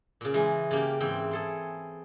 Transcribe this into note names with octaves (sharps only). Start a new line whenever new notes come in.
A#2 C#3
E3 G#3
C#3 A#3 G4
G#2 E3 C4 G5
G#4 A4 C6